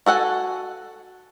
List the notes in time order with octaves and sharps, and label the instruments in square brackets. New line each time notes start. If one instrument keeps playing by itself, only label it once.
[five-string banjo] F#4 A4 F#5 G#5